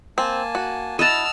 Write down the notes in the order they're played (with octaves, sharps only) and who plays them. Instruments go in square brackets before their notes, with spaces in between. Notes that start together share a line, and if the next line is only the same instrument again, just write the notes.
[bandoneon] A#3 G#5 A5 [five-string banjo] C4
[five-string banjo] F#4
[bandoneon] E4 [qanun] D#5 F#5 A5 [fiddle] E6 F6